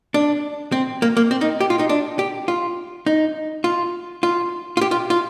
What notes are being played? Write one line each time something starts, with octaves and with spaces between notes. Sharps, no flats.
D4
C4
A#3
A#3
C4
D#4
G4
F4
D#4
D4
G4
F4
D#4
F4
F4
F4
G4
F4
F4